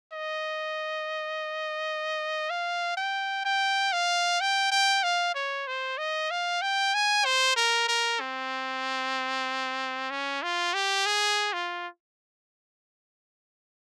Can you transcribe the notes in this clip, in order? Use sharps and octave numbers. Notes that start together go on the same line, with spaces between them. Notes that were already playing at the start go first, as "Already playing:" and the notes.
D#5
F5
G5
G5
F5
G5
G5
F5
C#5
C5
D#5
F5
G5
G#5
C5
A#4
A#4
C4
C#4
F4
G4
G#4
F4